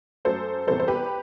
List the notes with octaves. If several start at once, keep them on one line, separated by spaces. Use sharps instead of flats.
F#2 F#3 A3 A4 C5
E2 C3 E3 G3 A4 C5
C5
G4 B4